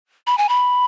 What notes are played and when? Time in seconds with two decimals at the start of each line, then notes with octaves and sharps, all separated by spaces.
0.27 B5
0.38 G#5
0.49 B5